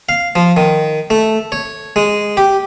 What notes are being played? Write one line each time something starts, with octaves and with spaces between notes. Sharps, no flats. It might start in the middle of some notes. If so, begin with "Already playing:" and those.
F5
F3
D#3
A3
C#5
G#3
G4